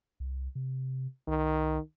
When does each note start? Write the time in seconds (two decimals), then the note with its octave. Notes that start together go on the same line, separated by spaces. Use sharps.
0.20 C2
0.55 C3
1.27 C2 D#3